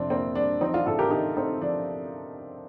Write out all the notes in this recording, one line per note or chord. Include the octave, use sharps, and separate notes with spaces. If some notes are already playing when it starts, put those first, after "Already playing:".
Already playing: F2 C3 C4 D4
A#3 C4
G3 D4
F3 C4 D#4
D4 F4
A2 F4 A4
G4 A#4
A2 D#4 G4
A3 C4 D#4
F3 D4